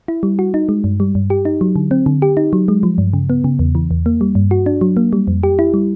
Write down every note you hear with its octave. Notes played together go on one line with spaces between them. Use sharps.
E4
G3
F#4
D#4
G#3
G2
G3
G2
G4
D#4
F#3
D3
C4
D3
G4
D#4
F#3
G#3
F3
G2
C#3
B3
C#3
E2
E3
E2
A#3
G3
G2
F#4
D4
F#3
A#3
G3
F2
G4
E4
G3